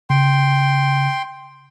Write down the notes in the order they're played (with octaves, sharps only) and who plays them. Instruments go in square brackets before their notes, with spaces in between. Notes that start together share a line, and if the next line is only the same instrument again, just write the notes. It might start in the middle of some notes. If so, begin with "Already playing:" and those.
[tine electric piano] C#3 [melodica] G5 C6